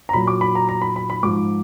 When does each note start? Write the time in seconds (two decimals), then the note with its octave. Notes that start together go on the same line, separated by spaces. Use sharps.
0.09 A#5
0.13 A#2 F#3 B5
0.28 D6
0.41 B5
0.55 A#5
0.69 A#5
0.82 B5
0.96 B5
1.10 B5
1.23 G#2 F3 D6